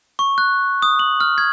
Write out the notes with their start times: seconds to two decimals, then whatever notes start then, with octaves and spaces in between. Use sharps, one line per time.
0.19 C#6
0.38 F#6
0.82 D#6
0.99 F#7
1.21 F6
1.38 G#6